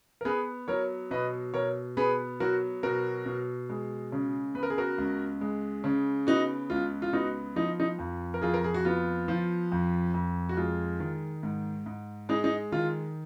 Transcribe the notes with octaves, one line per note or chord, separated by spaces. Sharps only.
A#4
B3 G#4 B4
F#3 A#4 C#5
B2 B4 D#5
B2 A#4 C#5
B3 G#4 B4
F#3 F#4 A#4
B2 F#4 A#4
B2
G#3
C#3
B3 B4
A#4
G#4
F#4 A#4
C#2
G#3
C#3
B3 D#4 F#4
C#2 F4
F4
B3 D#4 F#4
F3 D#4
D#4
F2
A#4
F2 F4 G#4
A#4
G#4
F#4
B3 F4
F3
F2
F2
F#4
G#3 F4
D#3
G#2
G#2
G#3 D#4
D#4
D#3 F4